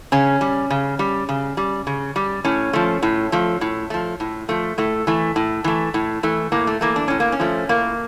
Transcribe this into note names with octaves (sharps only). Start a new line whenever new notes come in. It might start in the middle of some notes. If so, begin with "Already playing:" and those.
C#3 C#4
G3
C#3
G3
C#3
G3
C#3
G3
A2 C#4
F3 A3
A2
F3 A3
A2
F3 A3
A2
F3 A3
A2 A3
E3 A3
A2
E3 A3
A2
E3 A3
A2 A#3
A3
E3 A3 A#3
D4
A2 C#4
A#3
C#4
F3 A3
A2 A#3